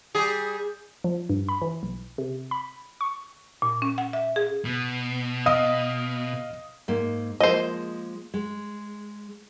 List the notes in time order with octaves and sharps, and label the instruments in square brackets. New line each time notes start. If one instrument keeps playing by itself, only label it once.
[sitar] G3 G#4
[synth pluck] F3
G2
B5
E3
B1
C3
B5
C#6
[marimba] A#2
C#4
F#5
E5
G#4
[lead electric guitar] B2
[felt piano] D#5 F5 D#6
[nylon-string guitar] G#2 A#3
[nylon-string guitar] F3 G#3 A#3 [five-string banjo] C5 D#5
[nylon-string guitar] G#3